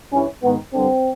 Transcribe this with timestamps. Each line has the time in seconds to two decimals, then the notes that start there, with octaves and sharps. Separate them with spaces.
0.12 G2 E3 C#4
0.43 G#2 D#3 B3
0.74 G2 D3 C4